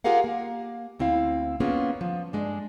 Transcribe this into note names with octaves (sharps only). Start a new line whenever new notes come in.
F4 G4 G#4 A#4 F5 F#5
A#3
D2 C4 E4 F5
A#3 B3 C#4 F4 G#4
F3
G2 G#3 D4